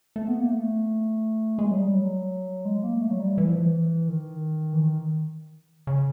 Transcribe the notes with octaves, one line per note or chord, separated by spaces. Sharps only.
A3
B3
A#3
A3
G#3
F#3
G3
F#3
G#3
A#3
A3
F#3
G3
E3
F3
E3
D#3
E3
D#3
C#3